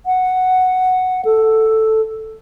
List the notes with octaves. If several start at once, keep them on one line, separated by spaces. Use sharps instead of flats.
F#5
A4